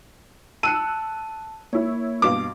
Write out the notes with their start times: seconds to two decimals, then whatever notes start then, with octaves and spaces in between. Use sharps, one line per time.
0.63 A5 E6 F#6 C#7 D#7
1.73 A#3 E4 C#5
2.22 G2 B2 F5 D6